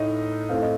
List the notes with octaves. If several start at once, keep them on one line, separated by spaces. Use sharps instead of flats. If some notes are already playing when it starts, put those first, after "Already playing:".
Already playing: A2 A3 D#4 D#5
A2 A3 C4 F5
D#5